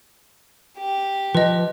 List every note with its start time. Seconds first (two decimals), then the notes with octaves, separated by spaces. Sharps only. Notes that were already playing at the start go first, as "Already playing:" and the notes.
0.78 G4
1.35 F3 B4 D#5